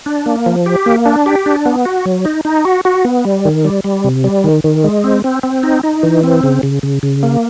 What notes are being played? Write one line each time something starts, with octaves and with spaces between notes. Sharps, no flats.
D4
A#3
F3
G4
A#3
D4
G4
D4
B3
F#4
F#3
D#4
D#4
F#4
F#4
B3
G3
D#3
G3
G3
C3
G3
D#3
D#3
G#3
C4
C4
C4
D#4
D#4
E3
C4
C#3
C#3
C#3
C#3
A#3